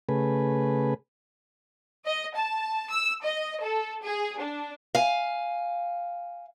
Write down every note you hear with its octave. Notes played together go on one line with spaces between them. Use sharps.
C#3 A3 G#4 B4
D#5
A5
E6
D#5
A4
G#4
D4
F5 G#5